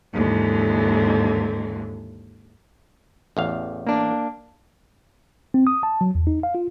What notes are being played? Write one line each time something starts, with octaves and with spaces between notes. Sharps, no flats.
D#2 G#2 D3 E3
A1 E2 F5
A#3 D4
C4
D#6
A5
F#3
E2
D#4
F5
F4